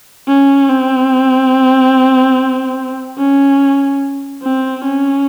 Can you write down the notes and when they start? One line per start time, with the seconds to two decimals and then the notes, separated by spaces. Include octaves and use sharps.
0.28 C#4
0.69 C4
3.18 C#4
4.43 C4
4.85 C#4